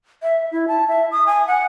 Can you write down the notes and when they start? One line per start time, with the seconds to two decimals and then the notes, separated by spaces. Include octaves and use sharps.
0.23 E5
0.52 E4
0.68 A5
0.89 E5
1.12 D#6
1.27 G#5
1.48 F#5